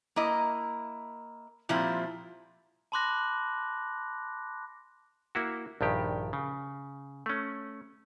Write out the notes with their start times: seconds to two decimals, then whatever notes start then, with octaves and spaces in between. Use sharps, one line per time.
0.16 A#3 E4 D#5
1.69 A#2 F3 G3 C4 E4
2.92 A5 B5 C6 D6 F#6 A#6
5.35 A#3 E4 F#4
5.81 A#1 G2 D#3 G4
6.33 C#3
7.26 A3 C#4